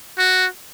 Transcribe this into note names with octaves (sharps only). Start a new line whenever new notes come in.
F#4